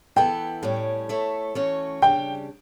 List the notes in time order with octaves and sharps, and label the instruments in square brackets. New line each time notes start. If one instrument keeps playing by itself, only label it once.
[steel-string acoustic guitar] E3 B3 E4 A4 [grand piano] G5
[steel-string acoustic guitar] A2 G3 C#4
A3 E4 A4 C#5
E3 A3 C#4 F#4 C#5
[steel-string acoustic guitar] C#3 G3 D4 G4 [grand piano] G5